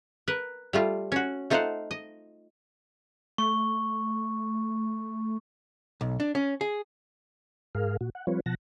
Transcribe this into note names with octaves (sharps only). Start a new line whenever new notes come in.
A#4 B4
G3 A3 F4
C#4 F#4
A3 D#4 F4 C5 F5 F#5
D#5
A3 C#6
B1
D4
C#4
G#4
G#2 G#4 A#4 F5
A#2 F#4
F#5
F3 G3 C4 F4 B4 C#5
B2 F3 F#5 A5 A#6